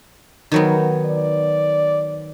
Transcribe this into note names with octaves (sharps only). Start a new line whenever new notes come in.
D#3 F#3 B3
D5